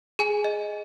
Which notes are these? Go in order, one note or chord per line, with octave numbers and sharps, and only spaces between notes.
G#4 G#5
D#5